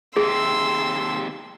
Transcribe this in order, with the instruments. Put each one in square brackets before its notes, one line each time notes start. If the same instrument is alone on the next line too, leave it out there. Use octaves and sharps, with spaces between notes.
[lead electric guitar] D#2 C3 [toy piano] G#4 [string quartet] C6 E6